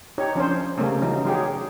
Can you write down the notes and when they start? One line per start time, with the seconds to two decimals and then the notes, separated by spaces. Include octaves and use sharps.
0.18 D#4 G4 C#5
0.35 F3 C#4 D4 C5
0.78 C#3 G3 A3 A#3 C#4
1.01 E3 F#3 D#4
1.25 F#3 D#4 G4 G#4 C#5